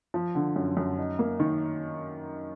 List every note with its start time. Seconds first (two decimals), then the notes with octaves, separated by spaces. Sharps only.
0.14 F3
0.35 D3
0.56 F#2
0.77 F#2
0.98 D#4
1.19 A#3
1.40 D#3